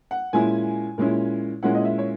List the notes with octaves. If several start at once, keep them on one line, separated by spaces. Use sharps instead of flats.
F#5
A#2 G#3 C#4 E4 G#5
A#2 G#3 C#4 E4
A#2 G#3 C#4 E4 F#5
D#5
E5
C#5